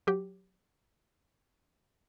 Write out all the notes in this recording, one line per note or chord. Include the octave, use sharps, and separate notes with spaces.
F#3 G4